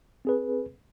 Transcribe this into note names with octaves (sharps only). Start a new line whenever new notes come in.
C4 G#4 B4